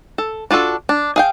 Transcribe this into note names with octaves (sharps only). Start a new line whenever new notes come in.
A4
D4 F4 F#4 A4
D4
G#4 F5 G5